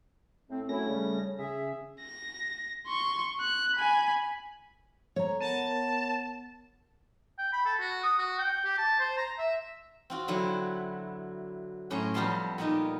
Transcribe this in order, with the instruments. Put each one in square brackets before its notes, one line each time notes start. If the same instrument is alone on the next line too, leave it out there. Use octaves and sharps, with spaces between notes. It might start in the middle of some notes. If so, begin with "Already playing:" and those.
[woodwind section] A2 C4
[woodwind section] F#2 E4 [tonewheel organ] A3 C#4 A#6
[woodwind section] C#3 G3
[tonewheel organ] C#3 [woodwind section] G#4 E5
[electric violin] A#6
C6 C#6
F#6
G#5 B5
[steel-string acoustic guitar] C#5 A#5
[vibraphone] B3 A#4 F#5 [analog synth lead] A5
[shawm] G5
B5
A4
F#4
D#6
F#4
G5
G4
A5
C5
A#5
E5
[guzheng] C4 F4 F#4
D3 F#3 E4
F#2 A2 C#4 E5 A#5 C6
F2 G3 B3 F5 A5 C6
A#2 B3 D#4 A#4